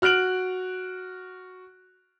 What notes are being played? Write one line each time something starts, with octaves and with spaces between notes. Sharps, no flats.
F#4 F6 F#6 D7 F#7